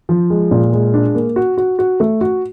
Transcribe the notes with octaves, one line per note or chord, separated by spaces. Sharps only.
F3
G#3
A#2
G#3
D4
A#3
F#4
F#4
F#4
A3
F#4